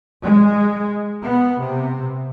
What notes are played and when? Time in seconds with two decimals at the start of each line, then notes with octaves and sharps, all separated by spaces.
0.24 G#3
1.23 B3
1.60 C3